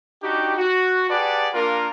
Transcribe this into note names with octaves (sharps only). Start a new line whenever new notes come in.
D4 D#4 F#4 G4
F#4
G4 G#4 B4 D5 F#5 A5
A#3 D4 F4 A#4